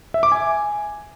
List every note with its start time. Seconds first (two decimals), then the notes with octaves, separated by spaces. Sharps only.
0.14 E5
0.23 D6
0.32 G#5